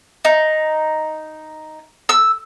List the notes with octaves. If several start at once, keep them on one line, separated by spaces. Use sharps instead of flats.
D#4
E6